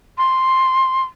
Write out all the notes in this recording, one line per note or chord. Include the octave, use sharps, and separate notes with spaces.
C6